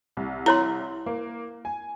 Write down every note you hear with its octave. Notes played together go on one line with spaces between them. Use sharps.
C2
E4 C#5 A#5 C6
A#3
G#5